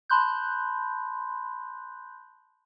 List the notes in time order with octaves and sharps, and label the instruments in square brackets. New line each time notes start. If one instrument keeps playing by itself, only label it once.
[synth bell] A5 B5 C6 F#6 G6